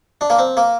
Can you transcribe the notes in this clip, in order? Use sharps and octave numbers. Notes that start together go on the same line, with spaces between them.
D4
A#3
C4
A#3